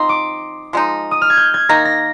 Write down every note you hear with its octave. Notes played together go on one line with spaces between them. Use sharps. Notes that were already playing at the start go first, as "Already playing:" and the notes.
Already playing: F3 C4 D#4 C6
D6
F3 G#3 D#4
D#6
F6
G#6
G6
G#6
D#3 A#3 D#4 A#6
A#6